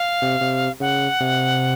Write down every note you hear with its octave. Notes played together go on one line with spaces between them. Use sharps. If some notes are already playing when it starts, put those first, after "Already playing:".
Already playing: F5
C3
C3
C#3 F#5
C3